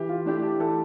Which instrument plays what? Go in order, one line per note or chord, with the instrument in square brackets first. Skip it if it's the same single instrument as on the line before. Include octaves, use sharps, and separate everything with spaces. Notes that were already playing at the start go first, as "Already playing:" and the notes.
Already playing: [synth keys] E3 [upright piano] G4
[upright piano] F4
[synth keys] A3 D4 G4 [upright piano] E4
[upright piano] G4
[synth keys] E3 [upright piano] A4